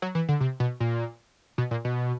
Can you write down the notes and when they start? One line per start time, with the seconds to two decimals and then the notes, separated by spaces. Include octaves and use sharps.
0.02 F#3
0.15 E3
0.29 D3
0.40 C3
0.60 B2
0.80 A#2
1.58 B2
1.71 A#2
1.85 B2